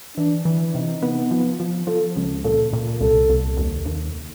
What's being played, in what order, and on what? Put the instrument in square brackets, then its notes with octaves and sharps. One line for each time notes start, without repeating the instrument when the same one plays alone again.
[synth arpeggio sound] E3 [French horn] D4
[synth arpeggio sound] E3
[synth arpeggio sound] C3 [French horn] D#4
[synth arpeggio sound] B3
F3
F3
[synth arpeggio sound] F3 [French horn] A4
[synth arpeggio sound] C#2
[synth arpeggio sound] A#2 [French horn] A4
[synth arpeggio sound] A#2
[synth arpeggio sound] C2 [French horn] A4
[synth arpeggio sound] C2
D#2
D#2